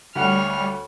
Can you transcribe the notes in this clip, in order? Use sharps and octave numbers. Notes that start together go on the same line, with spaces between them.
D2 G3 C#5 F#5 F6